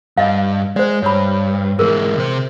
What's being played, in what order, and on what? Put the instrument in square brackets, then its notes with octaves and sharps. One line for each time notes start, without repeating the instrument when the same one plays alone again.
[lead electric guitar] G2 [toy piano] D#5 F5
[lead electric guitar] G#3 [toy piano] C5 D5
[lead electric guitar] G2 [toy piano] C#5 B5
[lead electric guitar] G#2 E3 [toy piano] G#4 A#4
[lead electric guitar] C3 C5